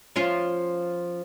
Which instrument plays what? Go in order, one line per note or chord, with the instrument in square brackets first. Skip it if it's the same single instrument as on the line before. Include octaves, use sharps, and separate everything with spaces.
[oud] F3 C#4 F4